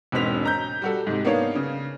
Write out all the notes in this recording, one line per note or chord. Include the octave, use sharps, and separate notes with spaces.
E1 G#2 B2 C4 B6 F7
A#5 G6
G3 F#4 A4
G#2 C3
A#3 B3 D4 D#4 C#5 F5
C#3